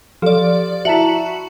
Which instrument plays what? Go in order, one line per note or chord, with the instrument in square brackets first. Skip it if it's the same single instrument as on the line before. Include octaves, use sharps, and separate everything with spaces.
[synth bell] F3 D5 [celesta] G4 A4 F5
[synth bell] E4 F#4 [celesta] E5 A5 A#5